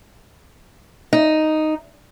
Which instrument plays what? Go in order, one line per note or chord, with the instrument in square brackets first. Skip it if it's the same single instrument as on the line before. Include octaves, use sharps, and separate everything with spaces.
[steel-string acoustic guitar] D#4